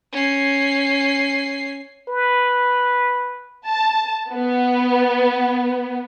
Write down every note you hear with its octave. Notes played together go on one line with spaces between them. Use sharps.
C#4 C7
B4
A5
B3